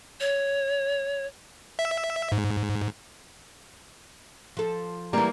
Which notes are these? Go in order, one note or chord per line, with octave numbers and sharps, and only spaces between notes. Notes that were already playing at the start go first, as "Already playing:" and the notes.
C#5
E5
G#2
F3 A4
E3 G3 A#3 A#5